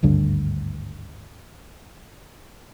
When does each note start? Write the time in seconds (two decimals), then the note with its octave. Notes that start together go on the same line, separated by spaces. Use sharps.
0.03 G#1 D2 G2 D3